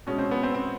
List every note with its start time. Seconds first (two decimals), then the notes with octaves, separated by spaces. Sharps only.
0.07 B2 G#3 C#4
0.18 C4
0.31 B3
0.43 C4
0.54 C4